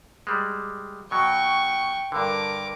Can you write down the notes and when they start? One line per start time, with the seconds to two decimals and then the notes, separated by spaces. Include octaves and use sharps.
0.27 G3 G#3
1.11 B2 F#3 G5 C#6
2.12 G2 D3 A#4 D6